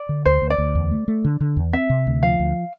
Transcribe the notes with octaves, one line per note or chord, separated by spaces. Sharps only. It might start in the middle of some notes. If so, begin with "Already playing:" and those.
Already playing: D5
D3
D2 C5
D2
D5
D2
E2
A3
A3
D3
D3
E2
C4 E5
C3
D2
F3 F5
D2